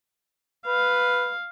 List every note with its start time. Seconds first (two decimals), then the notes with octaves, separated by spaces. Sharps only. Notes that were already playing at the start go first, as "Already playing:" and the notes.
0.67 B4 F5